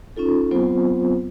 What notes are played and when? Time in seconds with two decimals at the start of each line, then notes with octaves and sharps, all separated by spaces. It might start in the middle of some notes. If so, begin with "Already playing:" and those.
0.17 C#4 D#4 F4 A4
0.51 F#3 B3 C4 F4 C5